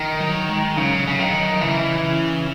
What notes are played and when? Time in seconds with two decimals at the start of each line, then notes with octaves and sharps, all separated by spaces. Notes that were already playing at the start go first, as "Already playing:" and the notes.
Already playing: D#3
0.21 F#3
0.49 G#3
0.76 C#3 F#3
1.07 C#3
1.19 D#3
1.61 C#3 E3
2.04 C#3